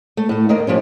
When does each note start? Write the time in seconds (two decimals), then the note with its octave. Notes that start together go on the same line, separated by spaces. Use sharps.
0.17 A3
0.29 A2 A3
0.49 D#2 D#3 A#3 D5 D#5
0.67 A2 F3 G3 C#4